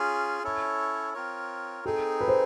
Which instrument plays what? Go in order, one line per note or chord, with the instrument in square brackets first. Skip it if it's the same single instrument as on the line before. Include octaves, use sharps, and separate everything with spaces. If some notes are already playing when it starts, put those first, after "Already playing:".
Already playing: [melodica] C#4 F4 G#4
C#4 E4 A4 C#5
C4 F4 A#4 C#5
[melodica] C4 D#4 G#4 [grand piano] A4
[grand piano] B4
C5